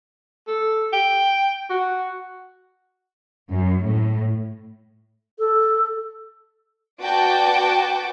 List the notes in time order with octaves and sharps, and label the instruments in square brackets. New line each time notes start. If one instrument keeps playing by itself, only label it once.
[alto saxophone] A4
G5
F#4
[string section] F#2
A2
[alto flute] A4
[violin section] F#4 B4 D5 G5 A5 D6